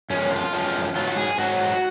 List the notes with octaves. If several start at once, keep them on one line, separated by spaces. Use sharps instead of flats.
F#2 F3 G#3 C#4
F4
F#2 F3 G#3
G#2 F#3 F4
F#4
G#4
G#2 F#3 F#4